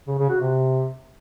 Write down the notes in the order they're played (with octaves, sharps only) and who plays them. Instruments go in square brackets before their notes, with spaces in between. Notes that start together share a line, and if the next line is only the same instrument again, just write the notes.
[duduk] C#3
C#3
F#4
C3